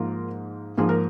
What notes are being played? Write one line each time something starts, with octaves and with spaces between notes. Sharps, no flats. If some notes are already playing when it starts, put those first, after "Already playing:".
Already playing: G#2 F3 A#3 F4 A#4
G#2 F3 A#3 G#4
A#4